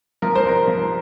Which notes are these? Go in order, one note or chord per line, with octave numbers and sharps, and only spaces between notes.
F3 A#4
C5
C2 A#4
F3